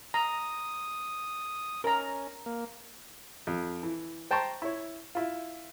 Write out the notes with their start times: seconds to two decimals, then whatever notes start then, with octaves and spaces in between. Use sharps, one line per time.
0.14 A#5 D#6
1.84 C#4 A#4 A#5
2.46 A#3
3.47 F2
3.83 E3
4.31 C5 G5 A5 A#5 C6 C#6
4.62 E4 C#5
5.15 E4 F4